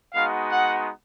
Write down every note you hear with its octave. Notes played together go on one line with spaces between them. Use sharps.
G#3 B3 D#4 F#4 F5
F#5